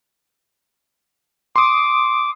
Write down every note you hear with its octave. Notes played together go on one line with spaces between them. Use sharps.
C6 D6 D#6